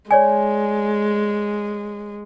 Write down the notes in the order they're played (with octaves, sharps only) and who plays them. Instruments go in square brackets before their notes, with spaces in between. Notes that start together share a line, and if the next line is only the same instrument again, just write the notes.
[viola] G#3 [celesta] C#5 D5 G#5